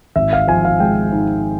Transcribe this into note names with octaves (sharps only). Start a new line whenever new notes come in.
G#1 E5
F5
F3 G#5
F5
G#3 G5
G#2